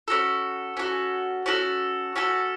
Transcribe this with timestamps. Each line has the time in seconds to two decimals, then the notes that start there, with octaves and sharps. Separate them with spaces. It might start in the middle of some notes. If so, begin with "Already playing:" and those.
0.08 C#4 F#4 A4
0.77 C#4 F#4 A4
1.46 C#4 F#4 A4
2.16 C#4 F#4 A4